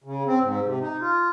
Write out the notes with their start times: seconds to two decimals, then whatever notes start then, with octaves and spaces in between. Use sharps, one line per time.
0.04 C#3
0.26 C4
0.40 G#2
0.65 C3
0.80 D#4
1.01 F4